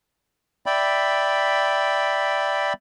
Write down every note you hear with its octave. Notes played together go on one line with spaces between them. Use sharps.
D5 E5 G5 B5